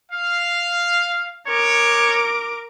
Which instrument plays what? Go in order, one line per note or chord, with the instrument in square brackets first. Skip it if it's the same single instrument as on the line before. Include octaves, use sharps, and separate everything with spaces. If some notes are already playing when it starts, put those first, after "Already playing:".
[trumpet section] F5
[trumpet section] G#3 C#5 [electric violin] A#4 D6